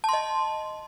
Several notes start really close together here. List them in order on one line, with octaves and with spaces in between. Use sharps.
A5 C6 D#5